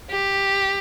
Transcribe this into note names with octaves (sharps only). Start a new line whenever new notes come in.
G4